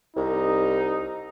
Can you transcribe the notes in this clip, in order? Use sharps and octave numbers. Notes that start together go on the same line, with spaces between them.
C2 D#4